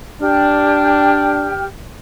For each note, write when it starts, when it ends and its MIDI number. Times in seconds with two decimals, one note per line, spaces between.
0.21 1.50 62
0.21 1.66 67
0.21 1.66 79
0.21 1.66 89